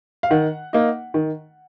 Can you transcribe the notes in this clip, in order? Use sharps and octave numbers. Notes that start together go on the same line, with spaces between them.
F5
D#3 F#5
A#3 D#4
D#3